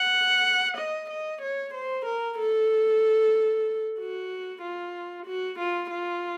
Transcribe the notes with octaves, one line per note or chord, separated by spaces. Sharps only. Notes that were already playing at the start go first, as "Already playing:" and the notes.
Already playing: F#5
D#5
D#5
C#5
C5
A#4
A4
F#4
F4
F#4
F4
F4